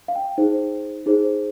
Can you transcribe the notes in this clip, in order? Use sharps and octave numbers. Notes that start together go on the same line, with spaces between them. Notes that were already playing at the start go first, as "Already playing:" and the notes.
F5
G5
D#4 G#4 C5
D#4 G#4 C5